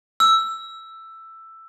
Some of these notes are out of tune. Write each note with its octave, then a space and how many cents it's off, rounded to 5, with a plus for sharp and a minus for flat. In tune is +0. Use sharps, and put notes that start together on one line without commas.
E6 +10